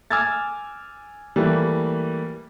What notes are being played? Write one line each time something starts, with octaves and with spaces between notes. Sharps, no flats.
G#5 D6 E6 F6 G#6 A6
E3 G3 A3 A#3 E4